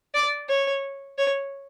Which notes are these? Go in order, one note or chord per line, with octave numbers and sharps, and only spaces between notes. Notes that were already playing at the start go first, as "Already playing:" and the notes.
D5
C#5
C#5